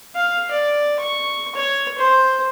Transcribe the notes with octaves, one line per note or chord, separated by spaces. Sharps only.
F5
D5
C#6
C#5
C5